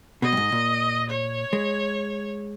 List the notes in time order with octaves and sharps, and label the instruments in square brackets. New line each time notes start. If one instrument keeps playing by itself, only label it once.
[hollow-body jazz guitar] B2 [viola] D#5
[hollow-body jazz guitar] G2
G#2
A#2
[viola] C#5
[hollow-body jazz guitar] G#3